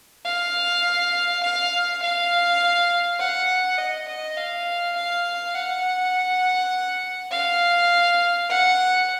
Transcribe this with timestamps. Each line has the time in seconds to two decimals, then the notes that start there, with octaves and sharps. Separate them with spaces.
0.25 F5
1.43 F5
2.02 F5
3.20 F#5
3.78 D#5
4.08 D#5
4.38 F5
4.96 F5
5.55 F#5
7.32 F5
8.50 F#5